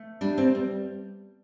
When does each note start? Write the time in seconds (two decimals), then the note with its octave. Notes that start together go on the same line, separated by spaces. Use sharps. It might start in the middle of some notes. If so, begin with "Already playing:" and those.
Already playing: A3
0.21 G3 D4
0.38 C4
0.55 G3